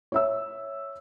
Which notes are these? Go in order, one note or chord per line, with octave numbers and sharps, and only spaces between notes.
C#5 E5 E6